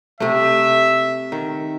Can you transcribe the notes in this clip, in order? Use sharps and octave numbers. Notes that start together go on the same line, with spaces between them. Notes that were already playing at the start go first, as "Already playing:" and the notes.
C3 A3 E5
D#3